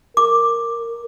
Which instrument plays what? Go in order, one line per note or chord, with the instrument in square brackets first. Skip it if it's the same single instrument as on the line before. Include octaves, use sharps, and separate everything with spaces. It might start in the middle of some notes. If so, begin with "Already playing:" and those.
[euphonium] A#4 [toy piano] D6